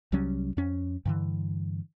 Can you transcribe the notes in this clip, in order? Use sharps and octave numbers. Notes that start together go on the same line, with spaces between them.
C2 F#3 G3 C#4
F2 C#4
G2 D3 E3